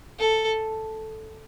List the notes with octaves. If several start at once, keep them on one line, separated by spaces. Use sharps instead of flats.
A4